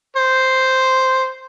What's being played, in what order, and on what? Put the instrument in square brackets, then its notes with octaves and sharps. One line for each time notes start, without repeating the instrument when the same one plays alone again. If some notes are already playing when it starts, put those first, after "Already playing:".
[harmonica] C5